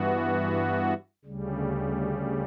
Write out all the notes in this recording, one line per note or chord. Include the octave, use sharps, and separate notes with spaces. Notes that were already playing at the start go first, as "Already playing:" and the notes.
Already playing: G2 E3 B3 F#4
D2 C#3 G3